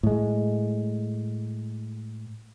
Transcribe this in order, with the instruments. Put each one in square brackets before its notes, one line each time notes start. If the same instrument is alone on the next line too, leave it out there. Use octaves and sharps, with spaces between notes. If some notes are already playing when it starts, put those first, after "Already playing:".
[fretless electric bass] A2 G#3